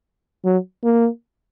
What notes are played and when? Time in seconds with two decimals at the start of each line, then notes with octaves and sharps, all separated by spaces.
0.45 F#3
0.84 A#3